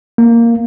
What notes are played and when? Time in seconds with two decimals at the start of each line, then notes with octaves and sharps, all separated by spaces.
0.18 A#3